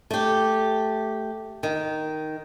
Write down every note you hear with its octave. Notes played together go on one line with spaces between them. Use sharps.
A3 G4
D#3